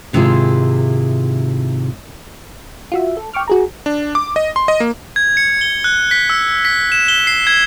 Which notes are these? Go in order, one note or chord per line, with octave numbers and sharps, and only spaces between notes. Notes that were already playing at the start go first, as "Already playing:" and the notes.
G#2 C3 D#3 E4 F4 G#4
F4 F#4 E5
A4
G5 C#6 D6 F6
F#4 G#4 A#5
D4
D6
D#5
C6
D#5
A#3
G#6
C#7
G7
F#6
B6
E6
B6
E7
G7
C7
G#6